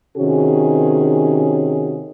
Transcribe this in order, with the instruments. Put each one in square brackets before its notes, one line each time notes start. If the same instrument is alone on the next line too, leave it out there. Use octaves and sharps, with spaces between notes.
[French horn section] C3 D#3 C#4 F#4 G#4